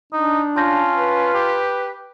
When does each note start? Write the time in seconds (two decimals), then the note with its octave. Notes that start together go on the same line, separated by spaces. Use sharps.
0.13 D4 D#4
0.56 C#4 F4 A5 G6 A#6
0.95 B4
1.34 G4